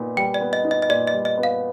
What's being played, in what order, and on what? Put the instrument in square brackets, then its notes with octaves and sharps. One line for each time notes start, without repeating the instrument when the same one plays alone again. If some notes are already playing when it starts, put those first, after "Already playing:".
Already playing: [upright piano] A#2 B3 D#4
[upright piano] G3 [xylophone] G5
[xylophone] D5
[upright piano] B3
[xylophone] D#5
[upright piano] D#4
[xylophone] D#5
D#5
[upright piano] A#2 [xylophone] D5
[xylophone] D#5
[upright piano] G3
[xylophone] D#5
[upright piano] B3
[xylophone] F5